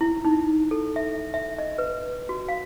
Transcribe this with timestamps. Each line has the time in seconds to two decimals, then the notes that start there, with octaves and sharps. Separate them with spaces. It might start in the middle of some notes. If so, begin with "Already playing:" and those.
0.01 E4
0.25 D#4
0.71 A4
0.96 E5
1.34 E5
1.59 D#5
1.78 B4
2.29 F#4
2.49 F5